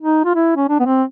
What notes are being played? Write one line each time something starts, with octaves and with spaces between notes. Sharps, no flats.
D#4
F4
E4
C#4
D4
B3
C4